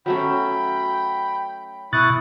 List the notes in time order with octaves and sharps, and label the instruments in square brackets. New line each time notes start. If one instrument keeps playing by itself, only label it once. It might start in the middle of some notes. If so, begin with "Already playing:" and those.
[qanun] F#3 A3 C#4 [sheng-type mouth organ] G5 B5
[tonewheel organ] B2 F#6 A6 [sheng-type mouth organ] E4 C#6 D#6